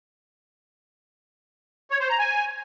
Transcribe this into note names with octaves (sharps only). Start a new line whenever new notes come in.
C#5
C5
A#5
G#5